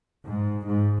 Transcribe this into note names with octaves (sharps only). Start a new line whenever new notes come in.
G#2
G#2